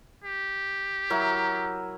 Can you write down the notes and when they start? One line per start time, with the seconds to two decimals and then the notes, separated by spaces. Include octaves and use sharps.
0.24 G4
1.10 F#3 E4 A#4